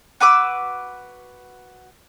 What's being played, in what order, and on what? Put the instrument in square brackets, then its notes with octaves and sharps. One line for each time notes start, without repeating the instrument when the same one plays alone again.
[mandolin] F#4 B4 D6 E6